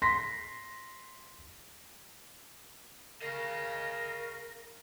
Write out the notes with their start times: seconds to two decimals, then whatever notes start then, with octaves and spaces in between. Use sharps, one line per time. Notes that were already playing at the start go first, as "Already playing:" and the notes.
0.02 C6 A#6 B6
3.22 C#3 A#4 D#5 F5